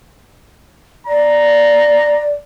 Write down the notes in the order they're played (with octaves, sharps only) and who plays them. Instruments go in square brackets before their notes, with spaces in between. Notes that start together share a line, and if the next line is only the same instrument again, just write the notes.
[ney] D5 [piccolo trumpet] A#5